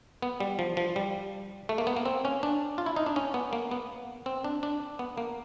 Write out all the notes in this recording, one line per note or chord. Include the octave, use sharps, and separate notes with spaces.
B3
G3
F3
F3
G3
A3
A#3
B3
A#3
C4
C#4
D4
F4
E4
D#4
D4
C#4
B3
A#3
B3
C4
D4
D4
B3
A#3